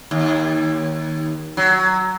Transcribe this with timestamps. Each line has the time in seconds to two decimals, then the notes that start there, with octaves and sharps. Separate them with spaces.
0.11 D#2
1.57 F#3